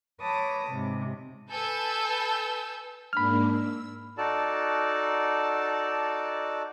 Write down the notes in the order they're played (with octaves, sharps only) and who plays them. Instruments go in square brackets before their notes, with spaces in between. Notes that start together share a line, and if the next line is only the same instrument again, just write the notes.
[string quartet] B4 C#5 A5 D6 D#6 A#6
G#2 C3
[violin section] A4 B4 G#5 A5 E6 G6
[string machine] G#2 A#3 D4 [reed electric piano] B5 F6
[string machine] E6
[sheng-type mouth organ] D#4 F#4 A4 D5 A5